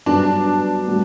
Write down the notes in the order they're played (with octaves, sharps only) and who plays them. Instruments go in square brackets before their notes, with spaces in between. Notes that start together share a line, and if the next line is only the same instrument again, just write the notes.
[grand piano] G2 F#3 B3 [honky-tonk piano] D4
[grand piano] A2 G3 B3 D4 F#4